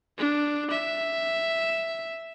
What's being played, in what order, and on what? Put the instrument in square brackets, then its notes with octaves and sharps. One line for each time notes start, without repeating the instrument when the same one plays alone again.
[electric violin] D4
E5